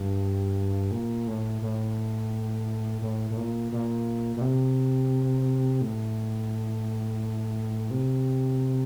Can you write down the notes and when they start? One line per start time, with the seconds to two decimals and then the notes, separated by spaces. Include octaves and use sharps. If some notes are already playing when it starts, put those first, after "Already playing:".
Already playing: G2
0.91 A#2
1.27 A2
1.62 A2
3.02 A2
3.30 A2
3.37 A#2
3.72 A#2
4.36 A#2
4.41 C3
5.81 A2
7.91 C3